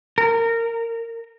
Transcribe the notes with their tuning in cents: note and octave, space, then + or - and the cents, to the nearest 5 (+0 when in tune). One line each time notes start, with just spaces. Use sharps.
A#4 -20